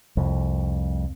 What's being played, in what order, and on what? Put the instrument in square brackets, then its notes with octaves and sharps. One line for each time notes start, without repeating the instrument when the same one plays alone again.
[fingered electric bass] C2 F2